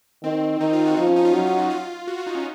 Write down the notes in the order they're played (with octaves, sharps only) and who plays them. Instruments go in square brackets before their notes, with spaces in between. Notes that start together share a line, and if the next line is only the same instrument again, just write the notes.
[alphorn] D#3 [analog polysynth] C4
[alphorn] D#3 [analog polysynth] D#4
[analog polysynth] F4
F#4
[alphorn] F3 [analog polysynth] D#4
[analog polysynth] C#4
D#4
F4
[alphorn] F#3 [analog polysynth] C#4
[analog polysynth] F4
F#4
F4
F#4
F4
D#4
C#4